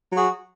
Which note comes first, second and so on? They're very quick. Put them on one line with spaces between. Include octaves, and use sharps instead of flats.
F#3 F#4 G#4